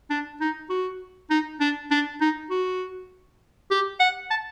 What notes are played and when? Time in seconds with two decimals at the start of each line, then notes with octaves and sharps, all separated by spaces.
0.10 D4
0.41 D#4
0.69 F#4
1.30 D#4
1.60 D4
1.91 D4
2.21 D#4
2.50 F#4
3.71 G4
4.00 F#5
4.30 A5